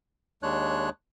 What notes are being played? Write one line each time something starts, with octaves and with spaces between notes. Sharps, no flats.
D#2 G#3 D4 C#5 F#6